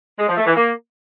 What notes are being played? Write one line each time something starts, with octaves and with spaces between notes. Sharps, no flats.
G#3
F3
A3
E3
A#3